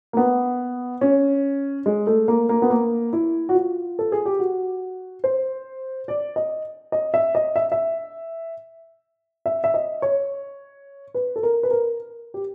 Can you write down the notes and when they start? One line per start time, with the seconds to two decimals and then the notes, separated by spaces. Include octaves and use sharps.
0.13 A#3
0.17 B3
1.01 C#4
1.86 G#3
2.07 A3
2.28 A#3
2.49 A#3
2.62 B3
2.70 A#3
3.13 E4
3.49 F#4
3.55 F4
3.99 A4
4.12 G#4
4.25 G4
4.39 F#4
5.24 C5
6.08 D5
6.36 D#5
6.92 D#5
7.14 E5
7.35 D#5
7.56 E5
7.72 E5
9.46 E5
9.64 E5
9.74 D#5
10.02 C#5
11.14 B4
11.36 A4
11.43 A#4
11.63 B4
11.71 A#4
12.34 G4